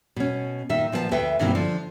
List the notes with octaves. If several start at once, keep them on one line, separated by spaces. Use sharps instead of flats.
B2 C#4
A#2 D#3 E5
A#2 F3 B3 E5 A5
D2 B4 E5 G5
G2 B2 D#3 E3 A#3 C4
D3 F3 D4